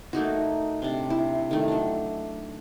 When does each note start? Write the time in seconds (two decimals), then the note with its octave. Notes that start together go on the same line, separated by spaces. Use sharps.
0.13 A3 A#3 D#4 F#4
0.82 C3 D4
1.10 E4
1.51 D#3 A3
1.68 F#3 D4